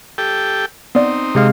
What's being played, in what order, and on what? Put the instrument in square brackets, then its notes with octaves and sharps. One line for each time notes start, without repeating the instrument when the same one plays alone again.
[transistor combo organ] G4 A4 G5
[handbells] B3 D5 [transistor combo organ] C4 D#4
[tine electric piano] C3 G#3 F5